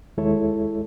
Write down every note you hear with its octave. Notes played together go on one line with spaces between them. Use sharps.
D#2 G#3 E4 A4 C#5